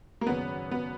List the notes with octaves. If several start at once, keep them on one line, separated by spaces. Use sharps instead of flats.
A#3
G#1 F#2 C#3 F#3 B3 C#4
B3